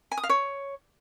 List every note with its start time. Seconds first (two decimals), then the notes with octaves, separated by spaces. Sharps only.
0.11 G#5
0.17 D#6
0.23 F5
0.29 C#5